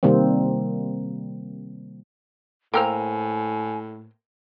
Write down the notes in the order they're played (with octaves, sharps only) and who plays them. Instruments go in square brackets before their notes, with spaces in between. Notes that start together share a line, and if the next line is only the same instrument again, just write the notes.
[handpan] C3 D#3 G3 A#3 C4
[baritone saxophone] A2 [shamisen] A#3 A#4 C5 [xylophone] G5 E6 F7 [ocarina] G#5